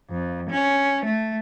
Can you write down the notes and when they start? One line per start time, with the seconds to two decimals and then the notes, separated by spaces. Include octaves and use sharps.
0.10 F2
0.50 C#4
1.05 A3